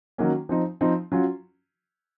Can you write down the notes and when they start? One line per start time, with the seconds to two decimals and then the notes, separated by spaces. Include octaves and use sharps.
0.18 D#3 F#3 A#3 C#4
0.49 F3 C4 D#4
0.81 F3 C4 D#4
1.12 F#3 C#4 F4